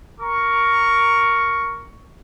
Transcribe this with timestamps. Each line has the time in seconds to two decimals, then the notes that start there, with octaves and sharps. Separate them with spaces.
0.21 A#4 C#6